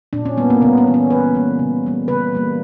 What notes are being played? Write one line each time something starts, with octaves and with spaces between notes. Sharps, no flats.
A#2 D4
C#4
G3 A#3 B3
A#3
C#3 B3
C#4
E3 G3 A#3
C#4
C#3 B4
E3 G3 A#3
C#3
E3 G3 A#3
C#3 B4
E3 G3 A#3